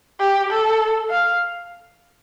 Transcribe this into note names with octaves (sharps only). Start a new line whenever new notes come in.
G4
A4
F5